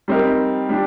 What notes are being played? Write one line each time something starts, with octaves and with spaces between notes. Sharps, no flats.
G3 C4 D#4 A#4
G3 D4